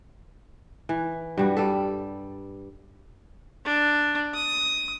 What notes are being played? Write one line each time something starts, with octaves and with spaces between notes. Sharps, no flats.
E3
G2 G3 F#4
G3 A4
D4
D#6